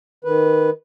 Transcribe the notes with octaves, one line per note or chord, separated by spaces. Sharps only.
D#3 B4